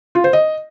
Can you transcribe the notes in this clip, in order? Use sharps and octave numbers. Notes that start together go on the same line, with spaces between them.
F4
C5
D#5